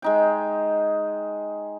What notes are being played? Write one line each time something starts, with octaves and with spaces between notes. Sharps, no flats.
G#3 D#4 G5